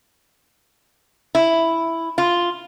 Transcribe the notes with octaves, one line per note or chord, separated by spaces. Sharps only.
E4
F4